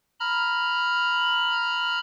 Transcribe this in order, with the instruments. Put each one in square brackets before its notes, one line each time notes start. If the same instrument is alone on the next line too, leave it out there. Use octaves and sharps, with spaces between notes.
[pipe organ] A#5 B5 F6